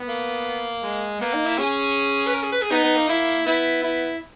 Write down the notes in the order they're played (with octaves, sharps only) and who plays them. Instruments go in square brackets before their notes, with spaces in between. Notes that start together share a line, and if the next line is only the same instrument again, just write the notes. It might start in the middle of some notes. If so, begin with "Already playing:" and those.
Already playing: [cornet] B3
[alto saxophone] A#3
[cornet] G#3
[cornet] A#3 [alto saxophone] B3
[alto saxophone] D#4
E4
[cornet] C#4 [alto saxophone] G#4
[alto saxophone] B4
A#4
G#4
B4
G#4
[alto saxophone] B3 [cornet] D#4
[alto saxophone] B3
A#3
[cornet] E4
[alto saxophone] B3 [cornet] E4
[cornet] E4